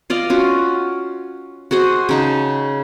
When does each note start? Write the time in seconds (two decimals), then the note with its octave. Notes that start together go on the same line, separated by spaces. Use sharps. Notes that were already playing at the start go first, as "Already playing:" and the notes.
0.10 F4 D5 D#5 F5
0.30 C#4 F4 F#4
1.71 F#4 G#4 C5 D#5
2.09 C#3 D#4 A5